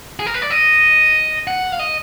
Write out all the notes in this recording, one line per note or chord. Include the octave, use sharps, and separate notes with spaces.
G#4
A#4
B4
D5
D#5
F#5
F5
D#5